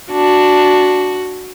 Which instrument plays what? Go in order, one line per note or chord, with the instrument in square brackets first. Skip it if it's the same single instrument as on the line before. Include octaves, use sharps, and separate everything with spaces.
[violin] D4 [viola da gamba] F#4